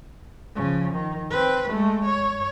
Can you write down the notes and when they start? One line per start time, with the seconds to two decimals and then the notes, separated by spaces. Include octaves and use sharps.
0.56 C#3 F3
0.95 D#3
1.31 C4 B4
1.69 G#3 A3
2.05 C#5